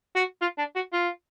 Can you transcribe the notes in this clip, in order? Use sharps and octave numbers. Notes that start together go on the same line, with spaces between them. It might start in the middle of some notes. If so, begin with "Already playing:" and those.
F#4
F4
D4
F#4
F4